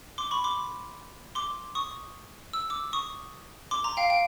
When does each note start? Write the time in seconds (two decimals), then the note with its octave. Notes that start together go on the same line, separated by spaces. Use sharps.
0.18 C6 D6
0.31 B5 C#6
0.44 C6 D6
1.35 C6 D6
1.75 C#6 D#6
2.53 E6
2.70 D6 E6
2.93 C#6 D#6
3.71 C6 D6
3.84 A#5 C6
3.97 F5 G5
4.10 F5 G5